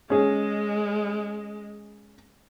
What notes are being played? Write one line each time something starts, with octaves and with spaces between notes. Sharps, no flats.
G#3 C#4 G#4